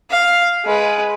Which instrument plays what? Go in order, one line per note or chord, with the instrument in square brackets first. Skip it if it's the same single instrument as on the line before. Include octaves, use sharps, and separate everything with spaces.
[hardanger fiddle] F5
G#3 B4